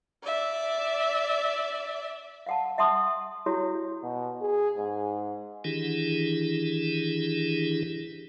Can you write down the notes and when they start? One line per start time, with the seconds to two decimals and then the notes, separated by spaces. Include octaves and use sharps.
0.23 D5 E5
2.46 F5 F#5 A5
2.78 E5 F#5 A5 C6 D#6
3.46 E4 F#4 G4 C#5
4.03 B2
4.41 G#4
4.78 G#2
5.65 D#3 E3 D4 E4 G4 G#4